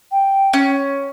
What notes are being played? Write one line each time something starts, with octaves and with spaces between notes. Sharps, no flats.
G5
C#4